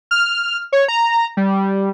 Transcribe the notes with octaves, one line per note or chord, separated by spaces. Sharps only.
F6
C#5
A#5
G3